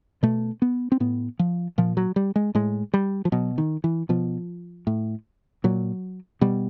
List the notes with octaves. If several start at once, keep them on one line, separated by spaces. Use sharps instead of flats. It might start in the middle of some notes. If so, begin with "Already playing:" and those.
B2 A3
B3
C4
A2 B3
F3
A#2 F3
F#3
G3
G#3
A2 G#3
G3
F3
B2 F#3
D#3
E3
B2 F3
A2
A#2 F#3
B2 G3